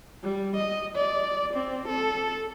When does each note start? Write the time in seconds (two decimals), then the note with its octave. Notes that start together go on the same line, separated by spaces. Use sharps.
0.23 G3
0.56 D#5
0.96 D5
1.54 C4
1.88 A4